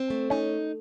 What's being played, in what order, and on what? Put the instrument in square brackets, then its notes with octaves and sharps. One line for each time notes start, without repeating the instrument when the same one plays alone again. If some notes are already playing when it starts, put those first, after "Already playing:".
Already playing: [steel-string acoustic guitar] C4
A3
[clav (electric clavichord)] C#4 [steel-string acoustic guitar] D#4